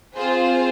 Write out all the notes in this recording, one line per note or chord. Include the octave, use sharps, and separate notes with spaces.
C4 F4 G#4 C5